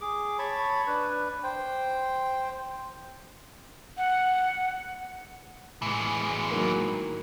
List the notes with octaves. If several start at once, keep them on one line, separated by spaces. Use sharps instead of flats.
G#4 D6
C#5 A5 B5 C#6
D4 B4
C5 G5
F#5
A2 E3 G#3
D#3 F#3 A#3